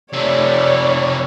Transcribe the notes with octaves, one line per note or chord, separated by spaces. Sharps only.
C3 A3 C#5 D5